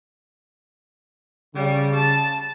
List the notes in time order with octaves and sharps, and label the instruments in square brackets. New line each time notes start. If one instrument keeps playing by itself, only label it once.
[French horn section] C#3 [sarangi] G3
[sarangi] A5